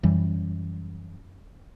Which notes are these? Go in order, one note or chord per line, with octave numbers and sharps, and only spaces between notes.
F#2 E3 G3